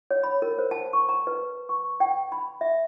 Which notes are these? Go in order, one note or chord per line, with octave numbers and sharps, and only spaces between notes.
C#5
B5
A#4
C5
A5
C#6
A#5
B4
C#6
G5
B5
E5